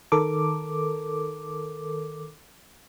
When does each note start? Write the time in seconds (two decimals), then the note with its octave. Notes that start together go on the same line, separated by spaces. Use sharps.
0.12 D#3 A4 A#4 D6